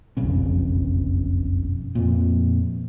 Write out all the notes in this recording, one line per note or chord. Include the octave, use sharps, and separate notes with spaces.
F#1 B1 F2 C#3
F2 A#2